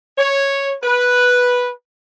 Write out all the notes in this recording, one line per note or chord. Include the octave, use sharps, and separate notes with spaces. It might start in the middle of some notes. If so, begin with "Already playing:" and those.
C#5
B4